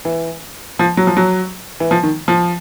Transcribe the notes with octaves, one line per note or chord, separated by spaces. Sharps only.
E3
F3
F#3
F3
F#3
E3
F3
D#3
F3